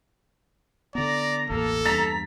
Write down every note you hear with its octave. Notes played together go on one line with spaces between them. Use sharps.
D3 B3 D5 A#5 A#6
E1 A1 E2 A#3 A4
E2 G2 A#5 A6 B6